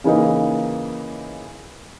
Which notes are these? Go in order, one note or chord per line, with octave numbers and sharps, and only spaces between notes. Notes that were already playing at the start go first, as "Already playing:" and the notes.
C#3 E3 A#3 D#4